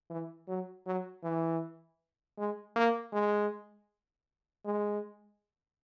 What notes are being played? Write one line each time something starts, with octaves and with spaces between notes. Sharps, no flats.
E3
F#3
F#3
E3
G#3
A#3
G#3
G#3